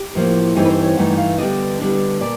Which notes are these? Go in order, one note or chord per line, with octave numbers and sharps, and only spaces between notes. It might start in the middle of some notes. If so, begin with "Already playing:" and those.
Already playing: G4
A2 F3 A#3
G2 E3 A3 C4 D#4 G#4
B4
C5
C#5
G2 E3 A3 D#4 F#5
F#5
F5
D3 G3 B3 D4 D#5
D3 G3 B3 D4
A#2 D5